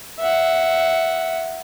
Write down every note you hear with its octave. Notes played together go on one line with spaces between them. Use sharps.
E5 F#5